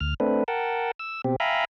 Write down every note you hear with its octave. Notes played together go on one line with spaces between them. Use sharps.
D2 F6
A3 C4 D4 B4
A#4 F#5 G5 A5
E6
B2 C4 G4
E5 F5 G5 G#5 A#5 B5